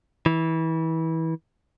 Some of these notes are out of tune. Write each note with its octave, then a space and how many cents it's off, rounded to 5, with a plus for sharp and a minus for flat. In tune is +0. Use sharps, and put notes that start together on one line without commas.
E3 -25